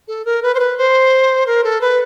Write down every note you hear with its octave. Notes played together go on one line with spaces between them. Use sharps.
A4
A#4
B4
C5
B4
C5
A#4
A4
B4